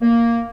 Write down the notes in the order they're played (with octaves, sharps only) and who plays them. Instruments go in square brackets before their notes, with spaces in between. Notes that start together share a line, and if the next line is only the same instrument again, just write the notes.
[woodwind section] A#3